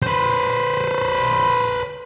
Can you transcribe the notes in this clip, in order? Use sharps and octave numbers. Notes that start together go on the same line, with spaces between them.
B4 C5